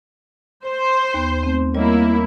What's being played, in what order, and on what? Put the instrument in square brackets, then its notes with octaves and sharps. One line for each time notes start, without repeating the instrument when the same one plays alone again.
[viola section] C5 [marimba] C6
[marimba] D#2 B3
A3 C4
[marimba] G3 C#5 D#5 [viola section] A#3 E4